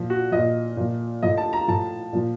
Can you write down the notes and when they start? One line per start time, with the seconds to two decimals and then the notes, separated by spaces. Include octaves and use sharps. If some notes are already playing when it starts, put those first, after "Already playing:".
Already playing: A#2 F3
0.10 F#4
0.31 A#2 F3 D#5
0.77 A#2 F3
1.23 A2 F3 D#5
1.37 A5
1.53 A#5
1.68 A2 F3 A5
2.13 A#2 F3